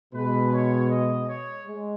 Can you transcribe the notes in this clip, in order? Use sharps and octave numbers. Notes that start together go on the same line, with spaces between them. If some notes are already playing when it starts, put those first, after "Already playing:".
B2 G#3 B4
C#5
D#5
C#5
G#3